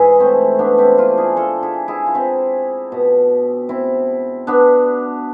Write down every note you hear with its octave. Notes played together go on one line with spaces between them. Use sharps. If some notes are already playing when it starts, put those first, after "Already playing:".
Already playing: G#2 E3 E4 G#4
A3 C4
B3 D4
C4 E4
D4 F4
E4 G#4
F4 A4
E4 G#4
E4 G#4
F4
C4 E4
B2
C4 E4
B3 D4